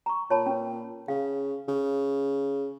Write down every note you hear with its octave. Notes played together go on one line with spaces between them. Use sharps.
A#5 C#6
A#2 C#5 A5 B5
C#4 B4
C#3 F5
C#3